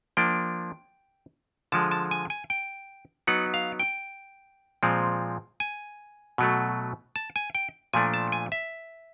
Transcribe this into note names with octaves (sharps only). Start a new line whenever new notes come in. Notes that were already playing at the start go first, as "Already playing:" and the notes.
F3 A#3 D4 G5
D3 F3 G#3 A5
A5
G#5
G#5
G5
F#3 B3 D#4 F#5
F5
G5
A#2 F3 G#3 C4
G#5
B2 F#3 A3
A5
G#5
G5
A#2 F3 A3 D4 G#5
A5
G#5
E5